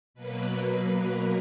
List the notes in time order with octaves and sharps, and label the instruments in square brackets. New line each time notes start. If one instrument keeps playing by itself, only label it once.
[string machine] B2 F#3 A#3 B4
A#4